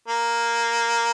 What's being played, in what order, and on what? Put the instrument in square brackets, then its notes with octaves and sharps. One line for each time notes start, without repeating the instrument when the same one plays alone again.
[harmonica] A#3